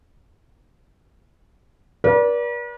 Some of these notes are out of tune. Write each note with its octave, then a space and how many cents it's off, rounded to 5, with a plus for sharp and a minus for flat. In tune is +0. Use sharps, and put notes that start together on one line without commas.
B4 -45 D5 -20